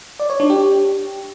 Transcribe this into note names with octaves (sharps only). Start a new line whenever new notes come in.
D5
C#5
D4
G4